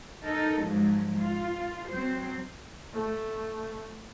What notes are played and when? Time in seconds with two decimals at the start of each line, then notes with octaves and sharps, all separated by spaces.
0.22 D#4 A4 A#4
0.62 G#2 F3 F#3
1.19 F4
1.91 F#3 C4 C5
2.93 A3